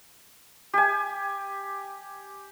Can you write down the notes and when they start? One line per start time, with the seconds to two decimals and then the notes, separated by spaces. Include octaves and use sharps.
0.73 G4 G#5